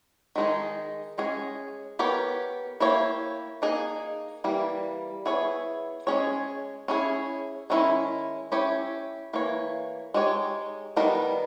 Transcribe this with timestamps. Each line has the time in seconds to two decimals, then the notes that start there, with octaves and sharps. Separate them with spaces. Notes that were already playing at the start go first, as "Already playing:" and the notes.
0.36 D#3 G#3 D#4 G#4
1.18 G#3 C#4 G#4
1.99 B3 G4 A#4 C#5
2.80 A#3 E4 G4 C#5
3.62 A#3 D#4 G#4
4.44 E3 G3 A#3
5.26 B3 E4 G#4 C#5
6.07 G#3 C#4 G#4 C#5
6.88 C#4 E4 G#4
7.70 D#3 G#3 C#4 E4
8.52 C#4 E4 G4 C#5
9.33 E3 A#3 C#5
10.14 G#3 D#4 G4 C#5
10.96 D#3 G3 B3 D#4 A#4